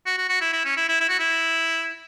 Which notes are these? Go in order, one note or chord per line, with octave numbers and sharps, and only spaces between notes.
F#4
F#4
F#4
E4
E4
C#4
E4
E4
E4
F#4
E4